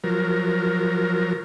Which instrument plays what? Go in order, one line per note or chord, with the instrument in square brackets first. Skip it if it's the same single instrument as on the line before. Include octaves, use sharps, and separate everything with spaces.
[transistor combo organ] F3 F#3 A#4